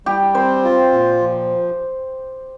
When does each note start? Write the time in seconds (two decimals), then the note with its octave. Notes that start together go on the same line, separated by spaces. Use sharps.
0.06 G3 G4
0.35 C4 C5
0.64 F4
0.93 A#2
1.21 F3